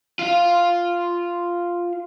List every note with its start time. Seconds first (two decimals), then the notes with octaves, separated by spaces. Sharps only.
0.19 F4 F5